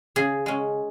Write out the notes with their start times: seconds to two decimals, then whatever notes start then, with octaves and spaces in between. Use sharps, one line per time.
0.16 C#3 G#4
0.46 G#3 C#4